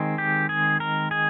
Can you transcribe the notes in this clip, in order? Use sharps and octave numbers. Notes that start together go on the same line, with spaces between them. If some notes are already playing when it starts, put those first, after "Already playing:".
Already playing: D#3 G#3 C4
G4
G#4
A#4
G#4